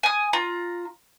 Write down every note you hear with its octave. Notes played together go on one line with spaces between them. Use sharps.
G#5 D#6
F4 A#5